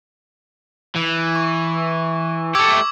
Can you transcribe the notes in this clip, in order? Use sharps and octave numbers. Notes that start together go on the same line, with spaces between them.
E3
C#6
A3 G4 D6 E6 G#6